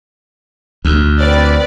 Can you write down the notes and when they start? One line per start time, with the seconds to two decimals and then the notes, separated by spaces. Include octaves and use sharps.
0.85 D2
1.21 C4 B4 D5